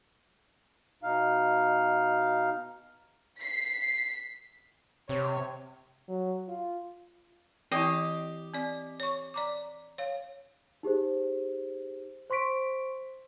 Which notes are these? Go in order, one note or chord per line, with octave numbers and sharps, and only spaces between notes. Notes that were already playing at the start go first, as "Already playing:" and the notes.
B2 D#4 F5
B6 C7
C3 C#5
F#3
F4
E3 C4 E4 G4 D#5 D6
C4 D5
C#5 C#6
D5 A#5 D6
C#5 F5
D#4 G4 G#4 C5
C5 C6 C#6 B6 D7